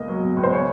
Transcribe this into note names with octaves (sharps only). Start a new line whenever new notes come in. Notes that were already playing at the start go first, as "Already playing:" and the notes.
Already playing: C#2 B2 A#3 D#5
F#3
B2
C#2
C5
C#3 C#5